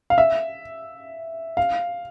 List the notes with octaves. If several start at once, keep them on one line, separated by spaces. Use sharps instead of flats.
F5
E5
F5